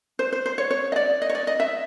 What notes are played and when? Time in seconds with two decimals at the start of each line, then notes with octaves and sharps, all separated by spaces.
0.19 C5
0.32 C5
0.46 C5
0.58 C#5
0.71 C#5
0.92 D#5
0.96 D5
1.22 D#5
1.30 C#5
1.35 D5
1.47 D#5
1.60 E5